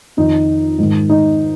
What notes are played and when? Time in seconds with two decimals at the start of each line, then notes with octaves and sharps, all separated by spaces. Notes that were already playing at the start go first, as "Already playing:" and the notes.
0.17 F2 D#3 D#4
0.78 G#2 D#3
1.10 D#4